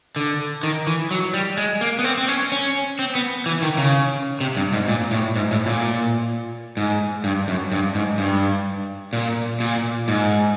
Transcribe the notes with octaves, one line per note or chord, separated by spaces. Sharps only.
D3
D#3
E3
F#3
G3
G#3
A#3
B3
C4
C4
C#4
C#4
C4
B3
E3
D#3
C#3
C3
G2
G#2
A#2
A2
G#2
A2
A#2
G#2
G2
F#2
G2
G#2
G2
A#2
A#2
G#2